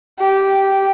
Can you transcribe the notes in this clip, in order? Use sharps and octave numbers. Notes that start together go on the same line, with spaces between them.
G4